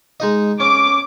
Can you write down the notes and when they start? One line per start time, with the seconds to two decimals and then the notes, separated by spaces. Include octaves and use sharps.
0.20 G#3 D#4 D#5
0.60 C#4 D6